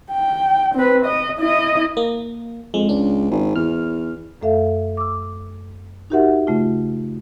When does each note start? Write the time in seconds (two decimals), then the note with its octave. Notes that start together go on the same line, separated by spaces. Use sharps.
0.13 G5
0.75 C4 B4
1.06 D#5
1.40 E4 D#5
1.97 A#3
2.74 F2 G#3
2.89 C#2 D4
3.31 G#1
3.56 E2 F6
4.41 F#2 A3 A4 E5 F5
4.97 D6 E6
6.10 D#4 F#4 G4 A#4 E5 F#5
6.47 C#3 A3 F4